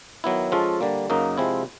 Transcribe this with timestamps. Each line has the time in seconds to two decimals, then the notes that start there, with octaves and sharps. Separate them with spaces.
0.24 D#3 F#3 B3 E4
0.52 F3 G#3 C#4 F4 A4
0.81 D3 G3 A#3
1.10 F#2 C#3 F#3 A#3 D#4
1.38 C3 F3 G#3 C4 E4